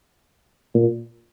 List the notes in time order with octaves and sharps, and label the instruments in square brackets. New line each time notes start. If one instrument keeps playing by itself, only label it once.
[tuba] A#2